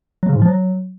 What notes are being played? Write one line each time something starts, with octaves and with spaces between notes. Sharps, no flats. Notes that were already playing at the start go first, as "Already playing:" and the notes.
F#3
C#3
G#2
F3
F#3